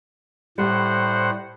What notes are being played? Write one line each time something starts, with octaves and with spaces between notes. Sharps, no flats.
A2 G3 C5 F#5